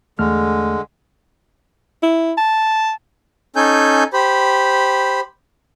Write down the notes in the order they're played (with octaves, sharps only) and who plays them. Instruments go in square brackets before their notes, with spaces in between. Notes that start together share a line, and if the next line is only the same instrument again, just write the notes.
[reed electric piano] E2 A3 F6 [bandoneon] D3 G#3
[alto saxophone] E4
A5
[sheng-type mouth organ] C#4 D#4 A4 G#5 G6
G4 C5 B5